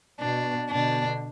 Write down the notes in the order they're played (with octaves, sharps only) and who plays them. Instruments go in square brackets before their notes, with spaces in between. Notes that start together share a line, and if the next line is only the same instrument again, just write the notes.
[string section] B2 [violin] D4
[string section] B2 D3 [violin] D4